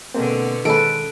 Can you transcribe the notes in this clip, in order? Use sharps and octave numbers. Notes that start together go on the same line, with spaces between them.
B2 D3 G#3 A#3 C4
D#3 G#3 C#4 A4 B4 D7